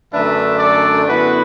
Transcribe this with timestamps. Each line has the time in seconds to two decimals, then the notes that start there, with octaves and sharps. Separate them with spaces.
0.13 F#2 D3 A3 D4 B4 E5
0.59 A4 D5
1.07 F#2 D3 B3 E4 F#4 B4